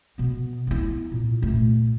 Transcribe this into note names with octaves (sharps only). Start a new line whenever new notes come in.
B2 B3
B3 E4
A#2
A#2 A3